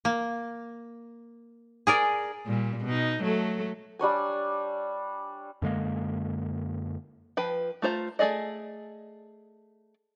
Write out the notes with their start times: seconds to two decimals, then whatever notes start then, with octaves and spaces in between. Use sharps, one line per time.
0.05 A#3
1.87 G#4 A#4 D5
2.46 A#2 G3
2.86 B2 D#4
3.23 F#3 A3 A4
3.99 G3 D4 C#5 G#5
5.62 F#2 D3 G#3 A#3
7.37 F3 B4 G5
7.82 A3 F4 C5 A#5
8.19 A3 D#4 G#4 D5 D#5